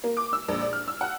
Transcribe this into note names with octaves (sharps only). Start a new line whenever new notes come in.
A#3
D6
E6
A#1
D5
F6
E6
F#5